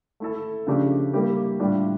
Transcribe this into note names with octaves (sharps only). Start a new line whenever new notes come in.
A3 E4 A4
C#3 F3 A3 D4 G4
G3 A#3 E4 G4
A2 G3 D4 F4